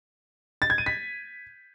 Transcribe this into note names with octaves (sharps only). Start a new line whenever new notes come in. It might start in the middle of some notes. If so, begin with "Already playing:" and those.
A6
G#6
D#7
B6